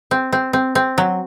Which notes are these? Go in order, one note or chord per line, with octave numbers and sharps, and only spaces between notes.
C4
C4
C4
C4
F#3